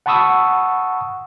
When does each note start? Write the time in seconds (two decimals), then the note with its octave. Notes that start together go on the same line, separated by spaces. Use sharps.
0.06 F#5 A5 B5 C#6 D#6 E6